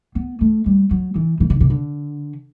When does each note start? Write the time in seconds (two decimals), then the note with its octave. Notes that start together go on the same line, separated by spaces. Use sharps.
0.15 B3
0.41 A3
0.66 G3
0.91 F#3
1.16 E3
1.40 E3
1.50 D3
1.60 C3
1.70 D3